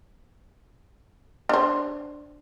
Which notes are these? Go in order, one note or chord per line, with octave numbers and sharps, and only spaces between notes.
D4 C5